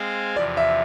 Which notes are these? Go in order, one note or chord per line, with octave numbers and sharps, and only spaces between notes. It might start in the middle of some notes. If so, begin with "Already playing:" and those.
Already playing: G#3 C4 G#4 C5 F5
E2 C3 F3 D5
E5